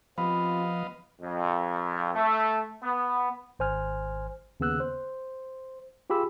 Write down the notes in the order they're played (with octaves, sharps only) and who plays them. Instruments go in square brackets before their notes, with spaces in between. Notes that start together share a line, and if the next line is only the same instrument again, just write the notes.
[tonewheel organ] F3 [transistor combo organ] B3 D#5 F5 [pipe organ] C4 F4 G4 [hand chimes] B5
[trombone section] F2
A3
B3
[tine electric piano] G#1 C5 G#5 F6
D#2 C#3 B3 E6 F#6
C5
F4 G4 G#4 B5 E6